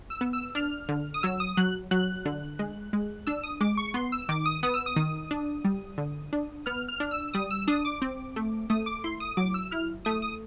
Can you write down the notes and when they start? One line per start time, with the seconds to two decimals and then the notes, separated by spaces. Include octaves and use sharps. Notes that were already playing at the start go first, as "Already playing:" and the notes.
0.10 E6
0.21 B3
0.33 E6
0.55 D4 F6
0.89 D3
1.14 D#6
1.23 F#3 E6
1.40 D#6
1.57 F#3 F#6
1.91 F#3 F#6
2.25 D3
2.59 G#3
2.93 G#3
3.27 D4 E6
3.43 D#6
3.61 G#3 D6
3.77 C#6
3.94 B3 C6
4.12 E6
4.29 D#3 D6
4.46 D#6
4.63 B3 D#6
4.74 E6
4.86 D#6
4.96 D#3
5.31 D4
5.64 G3
5.98 D3
6.33 D4
6.66 B3 F6
6.88 F6
7.00 D4
7.11 E6
7.34 G3 D#6
7.51 E6
7.68 D4 D#6
7.85 D6
8.02 C4
8.36 A3
8.70 A3 D#6
8.86 D6
9.04 E4 C6
9.20 D#6
9.37 F#3 D6
9.54 E6
9.71 E4 F6
10.05 A3 D#6
10.22 D#6